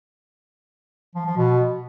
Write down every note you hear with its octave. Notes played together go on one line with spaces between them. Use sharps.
F3
F3
B2